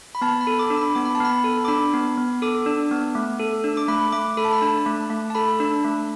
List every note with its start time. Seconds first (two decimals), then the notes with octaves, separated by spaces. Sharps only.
0.15 B5
0.21 B3 A5
0.41 B5
0.47 A4
0.59 D6
0.70 D4
0.77 B5
0.95 B3 D6
1.05 B5
1.15 A5
1.20 B3 B5
1.44 A4
1.65 D6
1.68 D4 B5
1.94 B3
2.17 B3
2.42 A4 D6
2.66 D4
2.91 B3
3.15 A3
3.39 A4
3.64 D4
3.77 D6
3.88 A3 B5
4.12 A3 D6
4.37 A4 B5
4.45 A5
4.53 B5
4.62 D4 A5
4.86 A3
5.10 A3
5.30 A5
5.35 A4 B5
5.60 D4
5.84 A3